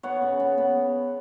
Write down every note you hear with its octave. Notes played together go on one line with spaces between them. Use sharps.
B3 C#5 F#5
C#3
B3
B3